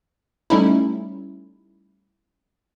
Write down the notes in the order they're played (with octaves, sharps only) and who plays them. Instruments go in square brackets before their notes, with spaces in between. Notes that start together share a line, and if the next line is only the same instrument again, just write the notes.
[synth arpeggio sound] G3 A3 C#4 D#4 E4